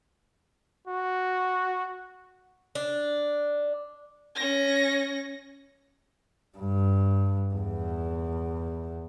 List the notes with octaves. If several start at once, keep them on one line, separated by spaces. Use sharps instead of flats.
F#4
D4
C#4 A#6
G2
E2